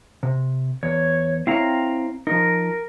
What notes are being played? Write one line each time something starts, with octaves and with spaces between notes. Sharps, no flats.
C3
E2 C#5
C4 E4 C#5 F5 A#5
F3 D#4 A#4